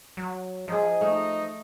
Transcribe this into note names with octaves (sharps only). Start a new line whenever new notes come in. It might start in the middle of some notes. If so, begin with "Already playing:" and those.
F#3
F3 D#4 G#4 D#5
A3 D#4